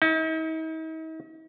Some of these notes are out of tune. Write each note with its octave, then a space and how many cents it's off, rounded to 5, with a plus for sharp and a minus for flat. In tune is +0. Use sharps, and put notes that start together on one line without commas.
D#4 +45